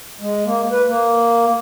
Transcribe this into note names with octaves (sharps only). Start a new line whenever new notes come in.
G#3
A#3
B4
A#3